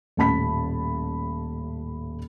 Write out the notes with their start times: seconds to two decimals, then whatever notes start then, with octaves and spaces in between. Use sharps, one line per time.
0.17 D#1 A1 A5 B5 B6